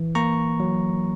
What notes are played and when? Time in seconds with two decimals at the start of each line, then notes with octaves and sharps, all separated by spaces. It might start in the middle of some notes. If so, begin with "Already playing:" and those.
Already playing: E3
0.15 A#3 A#5 C#6
0.60 F#3